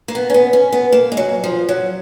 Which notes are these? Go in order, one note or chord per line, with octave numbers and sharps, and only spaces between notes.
A#3
B3
C#4
B3
C#4
B3
A#3
G#3
F#3
F3
F#3